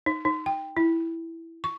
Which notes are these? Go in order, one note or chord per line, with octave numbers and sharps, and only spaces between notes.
D#4
D#4
G5
E4
C#6